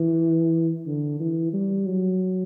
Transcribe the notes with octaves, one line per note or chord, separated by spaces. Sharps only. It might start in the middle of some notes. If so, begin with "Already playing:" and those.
Already playing: E3
D3
E3
G3
F#3